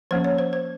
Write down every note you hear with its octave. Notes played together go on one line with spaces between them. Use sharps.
F3 A#3 C#4 C5
C#5
C5
C5